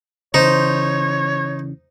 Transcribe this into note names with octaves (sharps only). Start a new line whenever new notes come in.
C#3 E3 D#4 C5 C#5